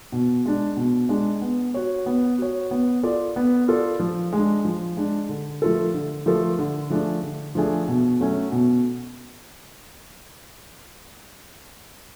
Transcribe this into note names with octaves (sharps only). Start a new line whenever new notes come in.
B2
G#3 D4
B2
G#3 D4
B3
F#4 C#5
B3
F#4 C#5
B3
F4 A4 D5
B3
F4 A4 D5
F3
G#3 D4
F3
G#3 D4
D3
F3 A3 F4 A4
D3
F3 A3 F4 A4
D3
F3 A3 D4 G#4
D3
F3 A3 D4 G#4
B2
F#3 A3 C#4 F#4
B2